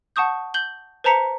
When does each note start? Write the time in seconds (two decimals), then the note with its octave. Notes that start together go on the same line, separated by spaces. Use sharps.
0.16 F#5 A5 C#6 D#6 G6
0.54 G6 F#7 G7
1.04 B4 C5 A5 A#5 B6 C#7